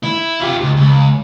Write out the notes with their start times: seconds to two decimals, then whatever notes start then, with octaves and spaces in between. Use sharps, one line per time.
0.03 E4
0.40 F4 G4
0.61 C#2
0.77 C#2